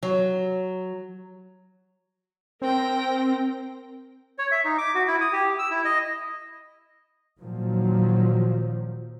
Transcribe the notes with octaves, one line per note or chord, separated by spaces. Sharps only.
F#3
C4 A#4 G5 A#6
C#5
E5
D#4
D6
F#4
E4
D#6
G4
E6
E4
D#5
A#2 D#3 F3 F#3